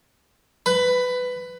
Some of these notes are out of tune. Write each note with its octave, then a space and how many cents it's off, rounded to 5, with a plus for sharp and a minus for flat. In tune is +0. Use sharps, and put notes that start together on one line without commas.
B4 +15